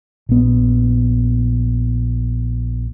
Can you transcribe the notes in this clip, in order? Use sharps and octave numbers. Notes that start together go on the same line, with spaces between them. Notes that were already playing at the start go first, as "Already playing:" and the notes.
A#1 B3